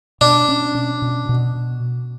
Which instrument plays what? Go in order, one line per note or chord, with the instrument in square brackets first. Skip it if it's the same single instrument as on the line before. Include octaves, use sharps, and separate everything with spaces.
[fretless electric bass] B2 [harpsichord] D4
[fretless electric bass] C#4
C#4
B2
B2